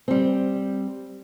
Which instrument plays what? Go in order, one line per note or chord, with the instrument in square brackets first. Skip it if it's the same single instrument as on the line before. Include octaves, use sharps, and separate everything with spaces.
[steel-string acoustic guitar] G3 C4